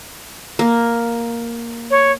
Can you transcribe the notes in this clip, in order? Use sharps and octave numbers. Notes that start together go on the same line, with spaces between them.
A#3
C#5